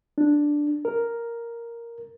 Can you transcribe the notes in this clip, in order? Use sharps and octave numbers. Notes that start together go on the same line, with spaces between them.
D4
A#4